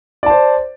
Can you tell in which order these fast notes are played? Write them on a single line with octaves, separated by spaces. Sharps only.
D5 A5 C5